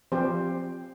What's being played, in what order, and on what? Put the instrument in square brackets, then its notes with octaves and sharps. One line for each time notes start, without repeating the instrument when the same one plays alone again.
[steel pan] F3 C4 G4 C5